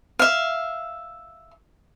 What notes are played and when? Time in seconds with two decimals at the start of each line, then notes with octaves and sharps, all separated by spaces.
0.19 E5 F5